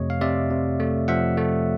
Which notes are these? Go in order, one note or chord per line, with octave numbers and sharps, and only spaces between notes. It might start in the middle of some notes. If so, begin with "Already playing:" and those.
Already playing: F2 C3 A3 C#5 D#5
F5
C3 D5 E5
C3
A3
F3 E5 F#5
A3